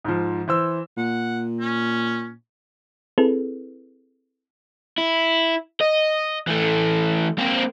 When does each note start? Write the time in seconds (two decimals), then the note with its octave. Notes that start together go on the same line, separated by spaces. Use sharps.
0.05 G#2 F3
0.48 E3 C5 E6
0.97 A#2 F#5
1.60 C#4
3.18 C4 E4 G#4 A4 B4
4.98 E4
5.81 D#5
6.47 E3 A3
7.38 A#3 C4